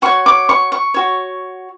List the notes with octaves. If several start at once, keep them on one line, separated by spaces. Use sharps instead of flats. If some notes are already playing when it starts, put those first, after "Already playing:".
F#4 C#5 C#6
D6
C#6
C#6
F#4 C#5